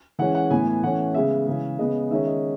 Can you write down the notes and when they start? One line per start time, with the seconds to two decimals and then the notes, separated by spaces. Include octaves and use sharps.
0.19 E3 G#3 C#4 F#5
0.35 F#5
0.50 A2 E3 B3 G#5
0.68 G#5
0.83 E3 A3 C#4 F#5
1.14 C#3 G#3 B3 E5
1.47 C#3 E3 G#3
1.79 C#3 G#3 B3 D#5
2.11 D#3 G#3 C#4 E5
2.27 D#5